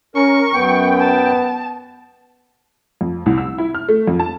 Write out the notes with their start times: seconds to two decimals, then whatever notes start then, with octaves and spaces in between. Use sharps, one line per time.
0.15 C#4 A#4 C#6
0.54 F#2 B3 G5
0.99 A5
3.01 F2
3.26 C2
3.38 E6
3.58 E4
3.75 F6
3.89 A3
4.08 F2
4.20 A5